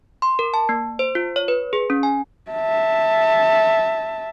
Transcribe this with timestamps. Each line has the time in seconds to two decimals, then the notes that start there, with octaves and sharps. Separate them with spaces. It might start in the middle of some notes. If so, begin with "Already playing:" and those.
0.22 C6
0.39 A#4
0.54 A5
0.69 A#3
0.99 C5
1.15 F4
1.36 C#5
1.48 B4
1.73 G#4
1.90 C#4
2.03 G#5
2.51 E5 A5